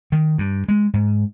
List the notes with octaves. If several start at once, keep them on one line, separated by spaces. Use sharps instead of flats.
D#3
G2
G#3
G#2